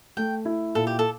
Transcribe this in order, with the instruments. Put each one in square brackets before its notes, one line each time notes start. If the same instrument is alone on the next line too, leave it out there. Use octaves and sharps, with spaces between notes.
[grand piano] A3 [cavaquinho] G5
[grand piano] E4
[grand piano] A#2 [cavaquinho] A4
[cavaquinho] G4
A4